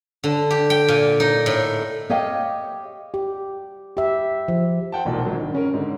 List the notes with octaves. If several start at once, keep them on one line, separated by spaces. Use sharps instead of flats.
D3
G4
G5
A#2
D#4
A2
G4 C#5 D#5 F5 G5
G4
G4 E5
F3
C5 F#5 G5 A5
E1 B1 E2 A#2
G#1 F#3
G2 D#3
C#3 C#4 A#4
G#2 D3